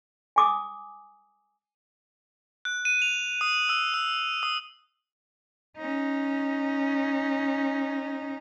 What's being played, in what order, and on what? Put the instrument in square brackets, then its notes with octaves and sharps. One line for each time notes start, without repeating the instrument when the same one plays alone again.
[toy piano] G#5 D6 D#6
[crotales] F#6
D#7
F7
D#6
E6
E6
D#6
[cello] C#4 D#4